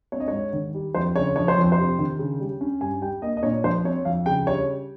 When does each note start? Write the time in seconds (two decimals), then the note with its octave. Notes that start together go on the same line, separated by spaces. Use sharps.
0.12 C4 C#5
0.20 D#5
0.28 G#2 C#5
0.53 D#3
0.74 G3
0.95 F2 C5
1.16 C#3 C#5
1.36 F3 C#5
1.48 C5
1.57 F2
1.72 C5
1.78 C3
1.99 D#3
2.19 C#3
2.40 G3
2.61 C#4
2.81 G2 G#5
3.02 G3 G5
3.22 A#3 D#5
3.37 D#5
3.43 A#2 C#5
3.64 F3 C5
3.84 C4 C#5
4.05 F2 F5
4.26 C#3 G5
4.46 G3 C#5